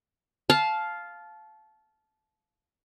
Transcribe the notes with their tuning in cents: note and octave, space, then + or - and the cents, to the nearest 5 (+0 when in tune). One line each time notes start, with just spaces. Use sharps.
F5 +0 A5 -20